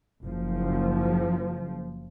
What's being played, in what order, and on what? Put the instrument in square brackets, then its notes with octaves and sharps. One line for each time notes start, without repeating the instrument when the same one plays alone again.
[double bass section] F#1 F3